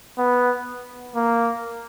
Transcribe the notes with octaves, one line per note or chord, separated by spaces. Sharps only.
B3
A#3